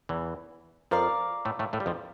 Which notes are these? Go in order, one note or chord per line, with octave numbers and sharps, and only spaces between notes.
E2 E3
F2 F3 A#4 D5 F5
A2 A3
A2 A3
A2 A3
G3
F2 F3